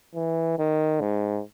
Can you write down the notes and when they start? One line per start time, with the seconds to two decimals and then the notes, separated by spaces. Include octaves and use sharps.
0.15 E3
0.59 D#3
1.01 G#2